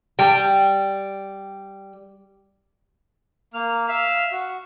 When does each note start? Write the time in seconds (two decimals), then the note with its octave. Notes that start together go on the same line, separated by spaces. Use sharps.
0.19 G3 G5
3.54 A#3 F6
3.88 E5 F5
4.32 F#4